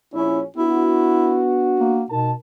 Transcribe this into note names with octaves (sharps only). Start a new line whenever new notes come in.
A#1 C#4 E4
B3 D4 E4 F#4
A#3
B2 D#4 A#4 A5